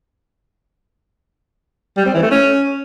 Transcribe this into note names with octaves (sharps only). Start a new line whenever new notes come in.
G3
C4
E3
A3
C#4